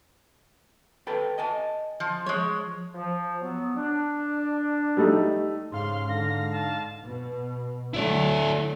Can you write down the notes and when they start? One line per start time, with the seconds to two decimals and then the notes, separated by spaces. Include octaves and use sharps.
1.07 A4 B4 G5
1.38 D#5 G#5 A5
2.00 F3
2.26 F3 G#3 C#5
2.95 F3
3.41 F#3 B3
3.76 D4
4.97 G3 A3 D#4
5.72 G#2 C#3 F5 C6 F6
6.09 D3 A#6
6.52 A5
7.03 B2
7.94 D3 F#3 A3 E4 D5